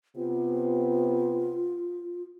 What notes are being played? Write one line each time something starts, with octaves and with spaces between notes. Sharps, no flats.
C3 B3 F4